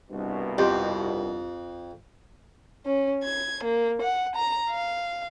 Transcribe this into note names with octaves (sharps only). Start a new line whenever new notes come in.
C2 G2 B2
F2 F4 G4 D#5
C#4
G#6
A#3
F#5
A#5
F5